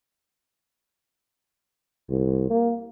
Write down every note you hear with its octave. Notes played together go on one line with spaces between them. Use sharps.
C2
A#3